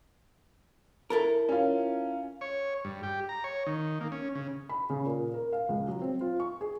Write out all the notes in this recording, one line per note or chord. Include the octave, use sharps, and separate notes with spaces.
E4 A4 A#4
C#4 F4
C#5
G2
G4
A#5
C#5
D#3
A#3
C#4
C#3
B5
C#3
A#2
A#4
F5
C#2
F#3
C4
F4
C#6
G#4